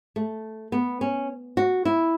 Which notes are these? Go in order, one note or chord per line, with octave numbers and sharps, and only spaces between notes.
A3
B3
C#4
F#4
E4